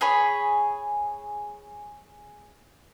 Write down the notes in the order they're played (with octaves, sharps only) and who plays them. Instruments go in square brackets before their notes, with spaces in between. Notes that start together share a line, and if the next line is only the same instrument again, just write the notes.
[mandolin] G#4 C#5 B5